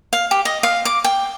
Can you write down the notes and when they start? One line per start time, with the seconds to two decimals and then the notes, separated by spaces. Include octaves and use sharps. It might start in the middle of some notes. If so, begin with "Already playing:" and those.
0.13 F5
0.31 G4
0.45 D#5
0.63 F5
0.85 D6
1.04 G5